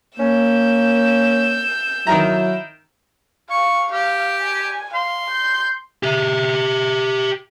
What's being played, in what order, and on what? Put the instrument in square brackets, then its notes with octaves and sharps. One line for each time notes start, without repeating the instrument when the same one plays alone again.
[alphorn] A#3 [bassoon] C#4 [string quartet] E6 G6
[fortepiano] D#3 A#4 A#5 [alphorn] F#3 [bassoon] E4
[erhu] F5 [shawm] C#6
[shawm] G4 [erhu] F5
[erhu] G#5
[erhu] F5 [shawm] C6
[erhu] G6
[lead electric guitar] G4 E5